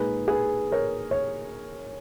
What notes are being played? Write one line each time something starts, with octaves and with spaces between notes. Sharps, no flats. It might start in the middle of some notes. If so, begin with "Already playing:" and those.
Already playing: A#2 G#3 D#4 G#4 B4
G#4 B4
A#4 C#5
C#5